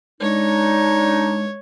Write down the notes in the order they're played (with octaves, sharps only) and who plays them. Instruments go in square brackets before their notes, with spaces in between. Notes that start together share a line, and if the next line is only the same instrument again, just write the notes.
[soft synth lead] G#3 [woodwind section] D4 D#4 [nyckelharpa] C#5